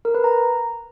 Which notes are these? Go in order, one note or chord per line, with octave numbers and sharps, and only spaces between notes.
A#4
B4
A#5